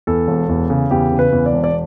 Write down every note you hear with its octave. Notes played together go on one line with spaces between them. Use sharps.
E2 A4
E1
E2
C#3
E2 G4
C#3
B4
E2
D5
E1
D5